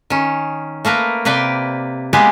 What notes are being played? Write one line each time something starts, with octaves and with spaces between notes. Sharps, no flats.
D#3 C#4
A3 A#3 A#4 B4
C3 A#3 B4 D5 G5
G#3 A#3 B3 G4 G#4